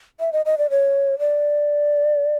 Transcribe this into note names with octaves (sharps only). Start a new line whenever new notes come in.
E5
D#5
D#5
D5
C#5
D5